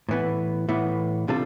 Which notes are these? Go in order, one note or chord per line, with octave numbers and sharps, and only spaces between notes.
A2 E3 B3
A2 E3 B3
C3 G3 D4 F4 A4